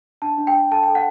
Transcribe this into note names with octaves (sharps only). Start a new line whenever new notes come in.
D4 A5
D4
G5
D4
A4 A5
G5
A4
F#5